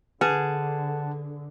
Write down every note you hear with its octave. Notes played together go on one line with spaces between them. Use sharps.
D3 G#4 B4 F#5 A5